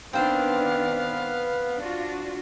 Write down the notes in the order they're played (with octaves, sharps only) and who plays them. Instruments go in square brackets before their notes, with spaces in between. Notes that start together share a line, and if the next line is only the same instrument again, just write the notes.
[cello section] D#3 D4 [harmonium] B3 [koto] C4 C5 [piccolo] F5
[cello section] D4 F4 F#4